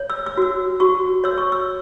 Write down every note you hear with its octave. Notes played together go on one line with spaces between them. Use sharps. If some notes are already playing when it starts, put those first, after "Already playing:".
Already playing: C#5
E6
E6
F#4 E6
F#4 C#6
C#5 E6
C#6
E6